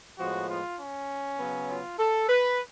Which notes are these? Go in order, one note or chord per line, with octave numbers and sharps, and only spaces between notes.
A2 F3 G#3 B3 F#4
F4
C#4
C#3 F#3 B3
F4
A4
B4